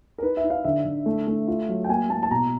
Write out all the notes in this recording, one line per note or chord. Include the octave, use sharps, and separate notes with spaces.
A#4
D#4 B4
E5
D#4
F5
D3 E5
D3
A3
A3
F4
F#3
G5
A#3 G#5
A#3 A5
A5
B2 A#5